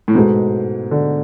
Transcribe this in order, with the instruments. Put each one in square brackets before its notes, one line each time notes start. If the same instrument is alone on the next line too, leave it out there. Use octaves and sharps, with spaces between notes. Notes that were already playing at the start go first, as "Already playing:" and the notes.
[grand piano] A2
[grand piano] G#2 [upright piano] B2 G#3 B3 F#4 A4
[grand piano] D3